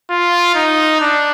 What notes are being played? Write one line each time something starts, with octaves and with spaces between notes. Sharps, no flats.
F4
D#4
D4